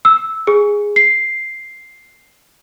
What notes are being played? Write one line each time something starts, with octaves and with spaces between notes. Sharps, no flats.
E6
G#4
C7